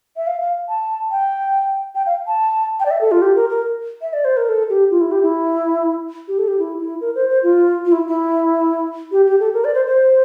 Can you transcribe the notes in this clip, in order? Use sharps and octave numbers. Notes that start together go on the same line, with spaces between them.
E5
F5
F5
A5
G5
G5
F5
A5
G5
D5
E5
A4
F4
G4
A#4
A#4
E5
D5
C5
A#4
A4
G4
F4
E4
G4
E4
G4
A4
G4
E4
E4
A#4
C5
C5
F4
F4
E4
E4
G4
G4
A4
A#4
D5
C5
C5